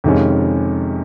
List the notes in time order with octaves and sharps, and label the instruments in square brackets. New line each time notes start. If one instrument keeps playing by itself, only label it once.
[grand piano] F2 C3 D#3 G#3 C#4